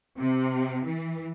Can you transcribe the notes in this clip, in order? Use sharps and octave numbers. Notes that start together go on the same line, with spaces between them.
C3
E3